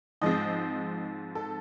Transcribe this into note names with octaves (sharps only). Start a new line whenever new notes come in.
G#2 F3 G#3 C4 D#5
A4